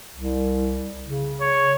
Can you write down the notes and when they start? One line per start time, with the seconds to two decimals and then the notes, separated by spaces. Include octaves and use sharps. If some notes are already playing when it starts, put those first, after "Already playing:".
0.15 C2
1.07 C#3
1.41 C#5